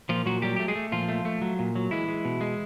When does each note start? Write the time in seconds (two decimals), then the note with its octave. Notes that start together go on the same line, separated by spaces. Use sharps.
0.09 A#2 F3 F4
0.26 A#2 F#3 F#4
0.42 F#3 G3 G4
0.56 A3 G4
0.68 G#3 G#4
0.75 A3
0.92 A#2 F3 F4
1.09 A3
1.25 A3
1.42 F#3
1.59 A#2
1.75 F#3
1.91 E3 G#3 E4
2.08 G#3
2.25 B2
2.41 G#3